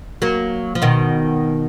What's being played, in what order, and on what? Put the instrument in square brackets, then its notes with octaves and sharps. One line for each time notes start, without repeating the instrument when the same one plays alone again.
[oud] F#3 A#3
F3
B2 D#3